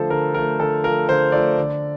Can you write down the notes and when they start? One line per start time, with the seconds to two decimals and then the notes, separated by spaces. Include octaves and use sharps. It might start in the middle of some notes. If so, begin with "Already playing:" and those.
Already playing: D3 F3 A3 A4 C5
0.10 D3 A#4
0.34 F3 A3 A#4
0.60 D3 A4
0.84 F3 A3 A#4
1.09 D3 C5
1.32 F3 A3 D5
1.58 D3